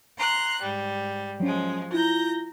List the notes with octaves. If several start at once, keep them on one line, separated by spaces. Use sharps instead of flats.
A#5 C6 F#6
G#2 G3
F3 F#3 G#3 C#4
E4 F4 A#5 G6 A#6